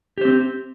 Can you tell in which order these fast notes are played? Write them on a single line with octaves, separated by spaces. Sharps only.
G4 C5 C4